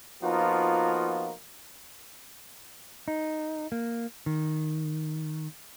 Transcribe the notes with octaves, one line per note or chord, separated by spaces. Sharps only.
F3 A#3 B3 D#4 F4 F#4
D#4
A#3
D#3